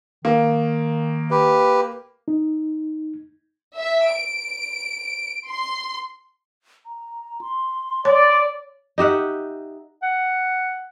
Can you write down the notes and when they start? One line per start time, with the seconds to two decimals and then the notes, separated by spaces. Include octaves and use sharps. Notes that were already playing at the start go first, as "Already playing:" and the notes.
0.25 D#3 A#3
1.31 G4 B4
2.28 D#4
3.76 E5
4.14 D7
5.48 C6
6.86 A#5
7.41 C6
8.05 C#5 D5
8.98 D#4 G4 E5 F#5
10.03 F#5